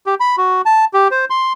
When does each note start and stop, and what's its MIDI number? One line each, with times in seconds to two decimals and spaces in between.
0.06 0.15 67
0.20 0.36 83
0.37 0.62 66
0.66 0.85 81
0.94 1.08 67
1.11 1.25 72
1.30 1.53 84